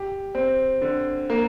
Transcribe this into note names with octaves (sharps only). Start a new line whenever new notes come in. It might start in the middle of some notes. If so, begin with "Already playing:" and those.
Already playing: G4
C4
D3
A#3